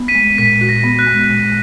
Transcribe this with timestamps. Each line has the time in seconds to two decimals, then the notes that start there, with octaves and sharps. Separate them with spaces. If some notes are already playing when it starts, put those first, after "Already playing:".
Already playing: B3
0.08 B6 D#7
0.15 G#3
0.38 A#2 B6
0.61 F#4
0.69 A#6
0.84 B3
0.99 F#6
1.07 G#3
1.30 A#2